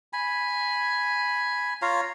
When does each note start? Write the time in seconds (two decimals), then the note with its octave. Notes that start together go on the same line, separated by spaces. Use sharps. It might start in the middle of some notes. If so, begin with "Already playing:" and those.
0.13 G#5 B5
1.82 F4 C#5 F5 A#5